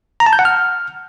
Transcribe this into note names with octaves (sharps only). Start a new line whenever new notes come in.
A#5
A5
G6
F#5
F6